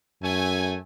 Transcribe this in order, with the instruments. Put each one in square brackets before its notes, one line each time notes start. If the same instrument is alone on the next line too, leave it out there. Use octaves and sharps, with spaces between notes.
[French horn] F#2 [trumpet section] A3 G#5